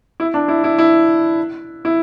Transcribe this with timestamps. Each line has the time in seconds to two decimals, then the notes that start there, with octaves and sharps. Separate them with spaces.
0.20 E4
0.34 D4
0.48 E4
0.64 E4
0.78 E4
1.85 E4